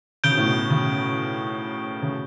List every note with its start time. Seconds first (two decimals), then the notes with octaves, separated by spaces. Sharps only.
0.24 C#3 G6 D7 G7
0.31 B2
0.37 A2
0.45 B2
0.70 C#3
2.02 C#3